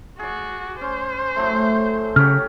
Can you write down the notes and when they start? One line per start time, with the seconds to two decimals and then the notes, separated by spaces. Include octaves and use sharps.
0.19 F#4 G#4 D5
0.81 C#4 C5
1.36 A2 F#3 A3
2.16 C#3 F#3 C#4 G4 F6